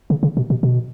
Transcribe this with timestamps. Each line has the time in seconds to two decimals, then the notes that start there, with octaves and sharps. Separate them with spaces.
0.10 C#3
0.23 C#3
0.37 B2
0.50 B2
0.63 B2